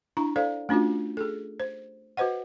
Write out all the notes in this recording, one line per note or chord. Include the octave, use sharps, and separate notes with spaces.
D4 E4 A#5
A4 C5 D5 F5
A3 C#4 D4 F4 F#4
G#4 A4
C5
F#4 B4 C5 D#5 F#5